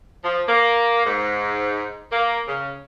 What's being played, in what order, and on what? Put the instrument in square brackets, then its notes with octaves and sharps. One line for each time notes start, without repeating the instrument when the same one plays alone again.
[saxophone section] F3
A#3
G#2
A#3
C#3